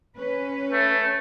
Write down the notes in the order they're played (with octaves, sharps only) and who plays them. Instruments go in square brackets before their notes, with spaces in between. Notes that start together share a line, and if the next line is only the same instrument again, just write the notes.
[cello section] C#4 B4
[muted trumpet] A3